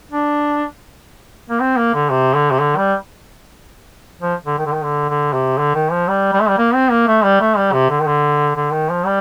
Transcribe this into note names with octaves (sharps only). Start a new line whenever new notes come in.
D4
A#3
C4
A#3
D3
C3
D3
C3
D3
G3
F3
D3
D#3
D3
D#3
D3
D3
C3
D3
D#3
F3
G3
G3
A3
G3
A#3
C4
A#3
A3
G3
A3
G3
C3
D3
D#3
D3
D3
D#3
F3
G3